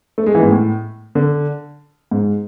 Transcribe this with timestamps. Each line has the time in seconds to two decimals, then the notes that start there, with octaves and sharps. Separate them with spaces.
0.18 A3
0.26 G#3
0.35 E3
0.43 G#2
0.51 A2
1.15 D3
2.11 G#2